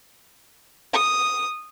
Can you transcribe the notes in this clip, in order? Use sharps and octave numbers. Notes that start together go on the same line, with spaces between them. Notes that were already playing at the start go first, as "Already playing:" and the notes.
D#6